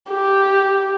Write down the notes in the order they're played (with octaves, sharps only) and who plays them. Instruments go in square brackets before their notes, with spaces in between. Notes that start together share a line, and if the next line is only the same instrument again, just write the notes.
[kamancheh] G4